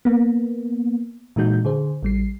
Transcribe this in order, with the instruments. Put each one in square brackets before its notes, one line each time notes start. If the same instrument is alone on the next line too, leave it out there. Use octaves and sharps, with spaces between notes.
[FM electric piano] A#3 B3
A#2 E3 G#3 D#4 F#4 G6
D3 G#4 C5
A1 G3 C7